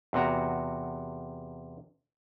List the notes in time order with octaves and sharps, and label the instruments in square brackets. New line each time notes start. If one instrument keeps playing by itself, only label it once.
[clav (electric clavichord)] E2 C3 F#4 A#5